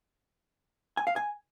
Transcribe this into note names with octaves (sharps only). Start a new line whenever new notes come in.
G#5
F5
G#5